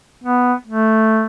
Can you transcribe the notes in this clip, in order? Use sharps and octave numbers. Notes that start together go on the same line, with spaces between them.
B3
A3